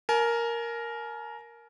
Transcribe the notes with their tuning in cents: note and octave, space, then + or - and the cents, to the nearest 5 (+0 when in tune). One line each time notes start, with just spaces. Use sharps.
A#4 +0 G#5 +40